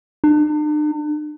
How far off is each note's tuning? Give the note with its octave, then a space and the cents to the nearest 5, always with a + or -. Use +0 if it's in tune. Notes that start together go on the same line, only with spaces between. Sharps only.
D4 +45